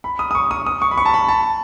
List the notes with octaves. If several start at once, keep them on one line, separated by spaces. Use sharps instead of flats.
B5
D#6
D#6
C#6
D#6
D#6
C#6
B5
C#6
A5
B5
A5